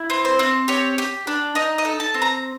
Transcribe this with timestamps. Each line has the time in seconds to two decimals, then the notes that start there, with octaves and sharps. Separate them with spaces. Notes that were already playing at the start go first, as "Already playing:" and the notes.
Already playing: E4
0.10 C4
0.25 C5
0.39 C4
0.68 G4 C#5
0.98 G4
1.27 D4
1.55 D#4 D#5
1.78 D#5
1.85 A4
2.00 A5
2.14 C4
2.22 A#5